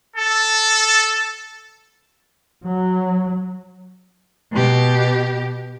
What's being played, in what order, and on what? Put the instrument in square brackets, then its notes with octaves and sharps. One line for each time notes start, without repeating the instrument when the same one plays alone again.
[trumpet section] A4
[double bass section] F#3
[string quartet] B2 G4